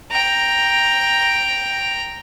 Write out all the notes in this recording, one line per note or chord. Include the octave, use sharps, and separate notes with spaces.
G5 A#5